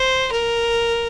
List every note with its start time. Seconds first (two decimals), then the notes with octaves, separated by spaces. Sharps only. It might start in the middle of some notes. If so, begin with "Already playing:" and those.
Already playing: C5
0.32 A#4